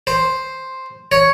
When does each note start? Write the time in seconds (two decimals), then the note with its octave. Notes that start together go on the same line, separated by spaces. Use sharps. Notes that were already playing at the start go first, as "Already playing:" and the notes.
0.07 C5
1.12 C#5